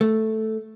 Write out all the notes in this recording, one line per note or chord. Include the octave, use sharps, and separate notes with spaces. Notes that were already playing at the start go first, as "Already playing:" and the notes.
A3